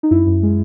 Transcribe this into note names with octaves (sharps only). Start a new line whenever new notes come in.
D#4
F#2 E4
F#2
G#3